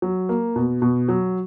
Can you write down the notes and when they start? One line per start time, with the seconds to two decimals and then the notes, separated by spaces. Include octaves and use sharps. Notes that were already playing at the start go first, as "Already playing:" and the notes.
0.02 F#3
0.29 A#3
0.56 B2
0.82 B2
1.08 F#3